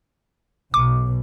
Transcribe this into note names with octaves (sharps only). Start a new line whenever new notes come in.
B1 B2 D6